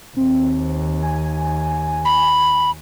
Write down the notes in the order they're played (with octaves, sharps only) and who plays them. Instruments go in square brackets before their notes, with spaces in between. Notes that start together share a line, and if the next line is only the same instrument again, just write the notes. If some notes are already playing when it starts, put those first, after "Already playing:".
[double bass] D#2 [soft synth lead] C4
[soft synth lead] G#5
[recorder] B5